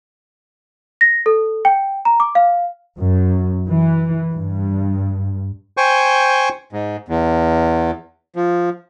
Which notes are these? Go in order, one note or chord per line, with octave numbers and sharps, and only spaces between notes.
A#6
A4
G5
A#5
D6
F5
F#2
E3
G2
C5 G5 G#5 C#6
G#2
E2
F3